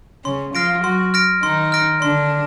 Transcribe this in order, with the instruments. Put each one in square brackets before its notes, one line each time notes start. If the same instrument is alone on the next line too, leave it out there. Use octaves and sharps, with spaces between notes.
[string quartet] C#3 C#4 [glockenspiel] C6
[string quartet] F3 F4 [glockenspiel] F6 A#6 D7
[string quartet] F#3 F#4 [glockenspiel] C6
[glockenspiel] F6 A#6 D7
[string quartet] D#3 D#4 [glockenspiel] C6
[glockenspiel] F6 A#6 D7
[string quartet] D3 D4 [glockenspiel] C6